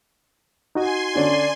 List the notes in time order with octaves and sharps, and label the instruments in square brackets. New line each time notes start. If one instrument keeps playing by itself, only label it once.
[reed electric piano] D#4 F#4 D#5 [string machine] G#5 C6
[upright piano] D3 C#4 [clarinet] D5